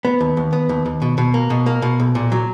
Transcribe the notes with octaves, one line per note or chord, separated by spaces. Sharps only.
B3
D#2
D#2
B3
D#2
D#2
B2
B2
A#3
B2
A#3
B2
B1
A#2
F#3